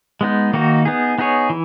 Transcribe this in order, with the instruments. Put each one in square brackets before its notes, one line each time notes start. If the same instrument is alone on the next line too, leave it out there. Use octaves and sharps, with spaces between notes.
[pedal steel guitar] G#3 B3 D#4
D#3 A#3 D#4 F#4
B3 D#4 G#4
B3 D#4 G#4 C#5
E3